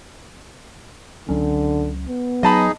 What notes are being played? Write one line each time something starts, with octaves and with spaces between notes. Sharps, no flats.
C#2 D3 F#3 C#4
B3
F#3 D#4 G#4 D#5 A5 B5